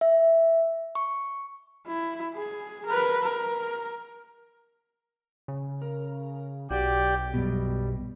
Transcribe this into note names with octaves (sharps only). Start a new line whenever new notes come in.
E5
C#6
E4
G#4
A#4 B4
A#4
C#3
A#4
B1 F#4 G4 D5 G5
F#2 B2 G3